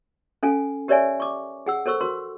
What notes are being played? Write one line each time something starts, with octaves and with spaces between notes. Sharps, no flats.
C#4 A4 F5 G#5
G4 A#4 C#5 D5 E5 G#5
C#6 D6
G#4 F#5 E6
A4 A#4 C5 C#6 E6
F#4 A#4 C6